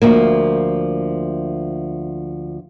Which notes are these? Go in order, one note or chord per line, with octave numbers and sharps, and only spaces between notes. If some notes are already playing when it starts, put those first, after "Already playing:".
D2 F3 A#3